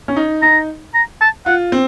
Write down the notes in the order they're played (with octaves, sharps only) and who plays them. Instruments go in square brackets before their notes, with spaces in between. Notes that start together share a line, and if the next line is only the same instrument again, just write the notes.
[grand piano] C#4
D#4
[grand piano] D#4 [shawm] A#5
[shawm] A#5
A5
[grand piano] F4 [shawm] F#5
[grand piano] C4